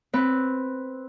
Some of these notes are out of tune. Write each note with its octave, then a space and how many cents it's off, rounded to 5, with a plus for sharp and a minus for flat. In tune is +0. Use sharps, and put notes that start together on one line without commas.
C4 +0 B4 +0